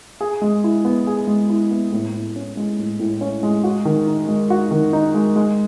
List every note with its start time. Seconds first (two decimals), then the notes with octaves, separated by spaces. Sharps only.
0.21 G#4
0.42 G#3
0.64 E4
0.85 B3
1.07 G#4
1.27 G#3
1.50 E4
1.71 B3
1.92 A2
2.13 A2
2.36 C#4
2.57 G#3
2.79 A2
3.00 A2
3.21 C#4
3.43 G#3
3.64 F#4
3.85 D#3
4.07 D#4
4.29 G#3
4.50 F#4
4.71 D#3
4.93 D#4
5.14 G#3
5.36 G#3